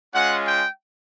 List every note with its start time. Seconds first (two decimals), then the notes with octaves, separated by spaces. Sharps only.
0.14 G#3 C#4 F4 F#5
0.46 G5